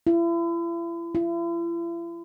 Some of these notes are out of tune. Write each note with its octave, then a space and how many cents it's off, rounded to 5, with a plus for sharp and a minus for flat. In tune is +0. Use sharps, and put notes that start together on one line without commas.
E4 +40
E4 +45